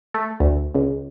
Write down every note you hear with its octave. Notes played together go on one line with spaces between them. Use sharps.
A3
D2
C#2